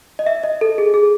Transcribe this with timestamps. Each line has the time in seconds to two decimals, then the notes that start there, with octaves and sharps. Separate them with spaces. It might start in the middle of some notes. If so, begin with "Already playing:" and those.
0.19 D#5
0.26 E5
0.43 D#5
0.61 A4
0.78 G#4
0.94 G#4